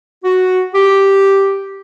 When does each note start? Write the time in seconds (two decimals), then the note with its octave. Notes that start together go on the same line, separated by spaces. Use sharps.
0.24 F#4
0.75 G4